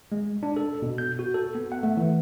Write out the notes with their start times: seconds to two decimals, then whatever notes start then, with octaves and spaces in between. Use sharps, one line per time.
0.12 G#3
0.43 D4
0.56 A4
0.82 B2
0.98 G6
1.19 F#4
1.34 A4
1.55 B3
1.72 F#5
1.83 A3
1.97 E3